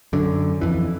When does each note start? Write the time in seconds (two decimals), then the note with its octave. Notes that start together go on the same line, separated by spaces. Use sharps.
0.13 F#2 D3
0.61 F2 E3